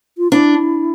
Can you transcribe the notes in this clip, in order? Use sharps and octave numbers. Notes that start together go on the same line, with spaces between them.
F4
D4 E4